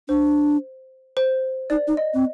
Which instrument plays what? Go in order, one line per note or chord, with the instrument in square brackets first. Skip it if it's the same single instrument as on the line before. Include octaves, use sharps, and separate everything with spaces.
[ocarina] D4 [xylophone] C5
[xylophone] C5
[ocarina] D#4 [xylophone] D5
[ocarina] D#4
[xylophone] D#5
[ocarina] C4